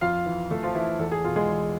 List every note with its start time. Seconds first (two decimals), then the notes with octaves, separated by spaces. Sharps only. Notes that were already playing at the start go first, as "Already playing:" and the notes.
0.01 F2 F4 F5
0.26 E3
0.51 F2 A3 A4
0.63 F3 F4
0.75 E3 E4
0.99 E2 A4
1.12 G#4
1.24 B2 F4
1.36 G#3 G#4
1.49 E2